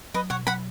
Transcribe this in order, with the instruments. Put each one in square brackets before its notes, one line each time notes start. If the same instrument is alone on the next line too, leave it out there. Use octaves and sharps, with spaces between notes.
[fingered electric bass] F#3 [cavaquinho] B4 D#5
[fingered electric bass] B2 [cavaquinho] C#5 F#5
[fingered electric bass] F#3 [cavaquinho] F#5 B5